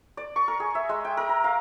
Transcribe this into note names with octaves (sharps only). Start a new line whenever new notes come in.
D5
C#6
A#4
G#4
E5
G#3
G5
A#4
A#5
F5